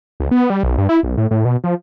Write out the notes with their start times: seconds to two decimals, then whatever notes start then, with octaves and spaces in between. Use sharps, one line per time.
0.20 C#2
0.31 B3
0.50 G3
0.63 B1
0.78 G2
0.89 E4
1.03 B1
1.17 A2
1.31 A2
1.45 B2
1.64 F3